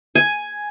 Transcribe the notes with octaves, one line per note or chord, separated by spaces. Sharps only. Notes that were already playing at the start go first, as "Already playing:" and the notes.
G#5